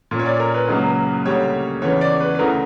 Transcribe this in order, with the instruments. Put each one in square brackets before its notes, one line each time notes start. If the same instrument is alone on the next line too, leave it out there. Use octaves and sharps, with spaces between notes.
[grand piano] A#2 A#3 C#4
C#5
D5
A#4
B4
C#2 C#3 F#3 A#3
D2 C#3 G3 A#3 C#5
E2 C#3 E3 C#5
D5
B4
B4
D2 C#3 E3 A#4